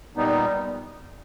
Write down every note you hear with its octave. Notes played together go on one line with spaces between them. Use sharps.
A#2 G3 B3 D#4